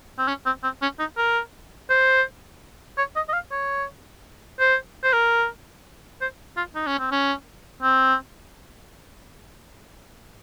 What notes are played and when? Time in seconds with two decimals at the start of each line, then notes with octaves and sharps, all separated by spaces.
0.18 C4
0.28 C#4
0.46 C4
0.63 C4
0.82 C#4
0.99 D#4
1.18 A#4
1.90 C5
2.98 C#5
3.16 D#5
3.29 D#5
3.33 F5
3.52 C#5
4.59 C5
5.03 C5
5.13 A#4
6.21 C5
6.57 F4
6.75 D#4
6.87 C#4
6.99 C4
7.11 C#4
7.82 C4